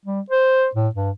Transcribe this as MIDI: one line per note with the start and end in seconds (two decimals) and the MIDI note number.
0.06 0.21 55
0.30 0.67 72
0.75 0.88 45
0.95 1.11 43